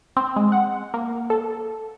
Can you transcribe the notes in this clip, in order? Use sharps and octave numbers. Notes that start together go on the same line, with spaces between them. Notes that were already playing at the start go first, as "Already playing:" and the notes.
C4
G#3
F#5
A#3
A4